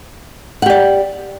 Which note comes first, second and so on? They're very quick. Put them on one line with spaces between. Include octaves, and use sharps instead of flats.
F#5 G4 D5